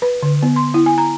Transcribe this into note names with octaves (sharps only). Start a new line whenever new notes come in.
B4
D3
B3
C6
E4
G#5
A#5